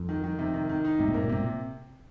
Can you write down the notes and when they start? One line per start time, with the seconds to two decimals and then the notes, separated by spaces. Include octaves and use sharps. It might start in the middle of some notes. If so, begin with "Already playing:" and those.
Already playing: F2
0.09 D#3
0.24 D#3
0.39 C3
0.54 D#3
0.69 D#3
0.84 D#4
0.99 G#2 C3
1.08 A#2
1.14 G#2 A#3
1.24 A#2
1.29 G#2 C3
1.40 A#2